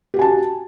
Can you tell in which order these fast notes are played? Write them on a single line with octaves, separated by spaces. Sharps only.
G4 F#4 G#5 A5